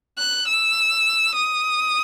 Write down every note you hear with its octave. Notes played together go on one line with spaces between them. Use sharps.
F#6
E6
D#6